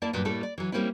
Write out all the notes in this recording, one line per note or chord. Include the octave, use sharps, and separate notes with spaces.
A#3 E4 D5 A5
G2 A#2 F#3
A2 G3 A3 A#3 E4 A4
D5
E3 F#3
G3 A#3 C4 C#4 E4